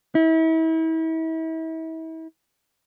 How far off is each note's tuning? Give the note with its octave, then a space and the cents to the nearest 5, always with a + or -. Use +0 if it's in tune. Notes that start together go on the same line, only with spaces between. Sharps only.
E4 -35